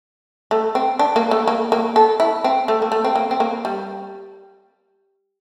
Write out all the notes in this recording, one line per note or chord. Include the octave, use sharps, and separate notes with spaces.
A3
C4
D4
A#3
A3
A#3
A#3
A4
E4
C4
A3
A#3
A3
C4
A#3
C4
A#3
G3